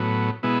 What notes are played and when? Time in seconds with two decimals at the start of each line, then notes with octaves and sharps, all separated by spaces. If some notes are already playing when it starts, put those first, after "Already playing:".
Already playing: A2 F#3 B3
0.43 B2 G#3 B3 E4